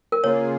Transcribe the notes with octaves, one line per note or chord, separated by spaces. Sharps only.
A#4
C#3 A#3 F4 G#4 C#5